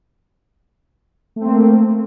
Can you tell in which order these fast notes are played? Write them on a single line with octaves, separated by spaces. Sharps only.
A3 C4 A#3